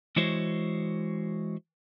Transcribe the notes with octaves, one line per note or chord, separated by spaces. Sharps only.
E3 G#3 E4 F#4 C5 C#5